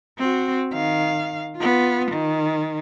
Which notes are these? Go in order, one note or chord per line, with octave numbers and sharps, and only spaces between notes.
C4 F#4
D#3 F5
B3 F4
D#3